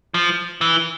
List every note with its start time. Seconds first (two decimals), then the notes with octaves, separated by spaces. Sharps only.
0.14 F3
0.61 E3